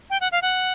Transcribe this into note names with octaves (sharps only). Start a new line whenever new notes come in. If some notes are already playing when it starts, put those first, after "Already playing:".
G5
F#5
F5
F#5